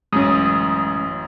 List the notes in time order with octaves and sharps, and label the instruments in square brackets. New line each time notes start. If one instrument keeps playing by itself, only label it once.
[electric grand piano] A1 F#2 [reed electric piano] G#3 C#4 [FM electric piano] D#6